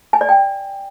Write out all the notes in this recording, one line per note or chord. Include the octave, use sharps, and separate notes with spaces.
G#5
D5
G5